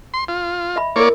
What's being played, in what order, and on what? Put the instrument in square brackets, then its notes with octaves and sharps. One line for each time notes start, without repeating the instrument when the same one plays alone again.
[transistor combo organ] C6
F4
[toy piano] D#5 E5 B5
[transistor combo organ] A#3 C#5 D5 [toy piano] E4 A#4